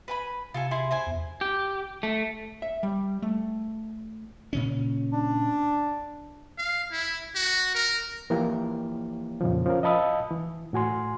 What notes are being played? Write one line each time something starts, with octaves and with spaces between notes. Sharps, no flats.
B4 G#5 B5
C3 F4 A4 G#5
E4 G#4 C6
E4 C5 G#5
E2
G4
A3
E5
G3
A3
A#2 C#3 C#4
D4
F5
E4
F#4
A#4
E3 F3 A#3 E4 G4 A#4
F2 A#2 C#3 F3
F3 C#4 A#4
D#5 F5 A5 B5 D#6 E6
E3
A2 F#4 G#5 C6